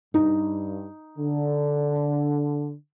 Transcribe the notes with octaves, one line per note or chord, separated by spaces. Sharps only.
G2 D#4
D3